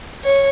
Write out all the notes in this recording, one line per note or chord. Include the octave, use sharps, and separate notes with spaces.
C#5